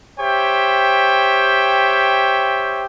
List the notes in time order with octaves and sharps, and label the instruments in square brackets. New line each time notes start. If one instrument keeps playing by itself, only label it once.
[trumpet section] G4 C5 C#5 E5 G5